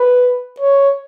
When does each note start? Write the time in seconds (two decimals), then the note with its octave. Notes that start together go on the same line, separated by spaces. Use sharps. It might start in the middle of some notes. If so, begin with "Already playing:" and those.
Already playing: B4
0.60 C#5